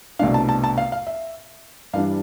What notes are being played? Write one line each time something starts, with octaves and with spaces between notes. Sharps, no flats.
C2 B2 A3 D4 F5
A5
A5
A5
F5
F5
E5
G2 E3 G3 D4 F5